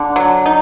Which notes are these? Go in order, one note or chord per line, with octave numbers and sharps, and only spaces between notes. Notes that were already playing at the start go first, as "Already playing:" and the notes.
Already playing: D3
F#3
D#4